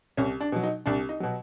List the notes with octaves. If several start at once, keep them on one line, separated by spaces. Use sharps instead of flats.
C2 C#4
D4
B2 F#3
D#4
C2 D4
D#4
B2 F#3